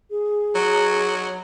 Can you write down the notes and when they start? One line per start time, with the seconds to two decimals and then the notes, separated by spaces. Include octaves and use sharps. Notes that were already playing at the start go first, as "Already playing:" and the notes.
0.11 G#4
0.55 F#3